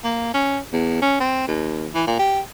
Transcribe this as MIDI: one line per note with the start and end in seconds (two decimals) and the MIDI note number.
0.04 0.29 58
0.34 0.59 61
0.73 0.99 40
1.02 1.17 61
1.20 1.45 60
1.47 1.89 39
1.94 2.03 52
2.07 2.18 46
2.19 2.40 67